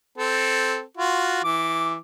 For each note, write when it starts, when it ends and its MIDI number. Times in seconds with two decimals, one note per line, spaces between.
0.18 0.81 60
0.18 0.81 69
0.97 1.40 65
0.97 1.40 66
1.44 1.96 52
1.44 1.96 86